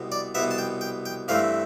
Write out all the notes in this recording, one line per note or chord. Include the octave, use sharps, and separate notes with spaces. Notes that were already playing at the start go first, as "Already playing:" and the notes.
Already playing: C2 B2 B3
D5
C2 B2 B3 E5
A5
G5
G5
G5
G2 E3 A3 C4 F5